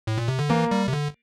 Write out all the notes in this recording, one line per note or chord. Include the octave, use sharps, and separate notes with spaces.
A2
A#2
C3
D3
E3 A#3
G3
C3
D3